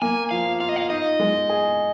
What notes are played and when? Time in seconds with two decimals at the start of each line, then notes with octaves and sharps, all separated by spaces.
0.02 A#3 G#5
0.31 F3 F5
0.60 F4 F5
0.69 D#5
0.76 F5
0.90 D#4 D#5
1.20 G#3
1.49 G#4